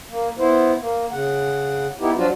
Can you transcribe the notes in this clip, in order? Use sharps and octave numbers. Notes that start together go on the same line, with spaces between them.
A#3
B3 E4 C5
A#3
C#3 F#5
B3 D#4 E4 G4
F3 F#3 D4 F4 F#4